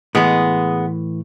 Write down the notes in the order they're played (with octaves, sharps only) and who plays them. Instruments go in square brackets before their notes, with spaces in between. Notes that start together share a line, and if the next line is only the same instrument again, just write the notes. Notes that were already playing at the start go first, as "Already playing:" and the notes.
[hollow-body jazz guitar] A2 E3 [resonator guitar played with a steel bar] G#3 B3 G#4